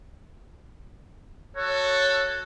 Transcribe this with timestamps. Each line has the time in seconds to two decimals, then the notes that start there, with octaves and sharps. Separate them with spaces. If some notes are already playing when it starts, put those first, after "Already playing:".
1.56 F#4 A4 C#5